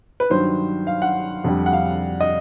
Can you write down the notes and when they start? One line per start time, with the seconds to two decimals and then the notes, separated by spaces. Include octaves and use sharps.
0.20 B4
0.30 G2 D#3 F#3 C5
0.87 F5
1.02 F#5
1.44 F2 D3 G3
1.66 F#5
1.73 F5
2.21 D#5